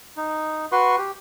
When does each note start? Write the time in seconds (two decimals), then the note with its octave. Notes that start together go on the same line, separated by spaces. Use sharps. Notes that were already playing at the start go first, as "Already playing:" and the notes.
0.17 D#4
0.72 F#4 B4 C6 C#6
0.98 G4